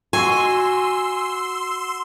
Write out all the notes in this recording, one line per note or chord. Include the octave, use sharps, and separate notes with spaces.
F#4 G#5 C6 E6